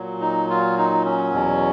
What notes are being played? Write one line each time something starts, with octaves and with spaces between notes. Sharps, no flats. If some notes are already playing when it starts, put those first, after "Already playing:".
Already playing: A#2 F#3
D#4
F4
D#4
C#4
E2 B2 F#3